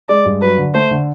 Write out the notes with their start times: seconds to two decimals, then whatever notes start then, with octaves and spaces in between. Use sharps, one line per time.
0.09 G#3 D5
0.26 G2
0.41 F#3 B4
0.58 D3
0.74 A3 C5
0.91 D3